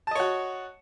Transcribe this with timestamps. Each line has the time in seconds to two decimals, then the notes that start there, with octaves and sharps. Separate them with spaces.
0.07 A5
0.11 D#5
0.15 C#5
0.20 F#4